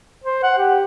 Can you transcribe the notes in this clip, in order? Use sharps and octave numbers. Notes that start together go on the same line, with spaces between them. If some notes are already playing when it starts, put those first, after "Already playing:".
C5
F#5
G4